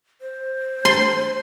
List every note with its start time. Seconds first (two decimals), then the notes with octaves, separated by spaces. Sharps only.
0.21 C5
0.85 C6